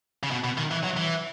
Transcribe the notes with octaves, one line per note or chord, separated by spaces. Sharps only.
C#3
B2
B2
D#3
E3
F#3
E3